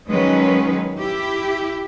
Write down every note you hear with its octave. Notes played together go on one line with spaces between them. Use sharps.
D#3 F#3 G#3 C#4 B4
E4 G4